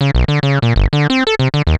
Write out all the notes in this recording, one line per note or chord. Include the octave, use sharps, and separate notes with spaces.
C#3
B1
D3
C#3
A#2
G1
D3
C4
A4
C3
D3
D#2